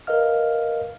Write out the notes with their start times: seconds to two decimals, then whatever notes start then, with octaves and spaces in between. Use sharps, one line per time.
0.07 A#4 B4 D#5 F5 F6